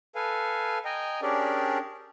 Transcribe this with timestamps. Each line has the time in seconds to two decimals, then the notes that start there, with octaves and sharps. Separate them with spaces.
0.15 A4 B4 F5 G#5
0.85 D#5 G5 G#5 A#5
1.22 C#4 D4 G4 G#4 A#4 D5